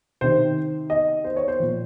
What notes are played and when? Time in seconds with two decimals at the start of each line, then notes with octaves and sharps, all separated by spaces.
0.21 C3 D#3 C5
0.90 D#5
1.24 C5
1.36 C#5
1.48 C5
1.60 A#2 F3